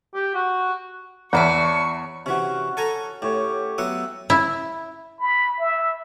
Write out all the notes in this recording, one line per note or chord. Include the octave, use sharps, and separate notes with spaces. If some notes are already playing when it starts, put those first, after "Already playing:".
G4
F#4
E2 B3 C#5 D5 E5 A5 B5 C#6
C3 E3 C#4 F#4
A4 G#5 A#5
A2 G4 C#5
F#3 B3 E5 F#5
E4
B5
E5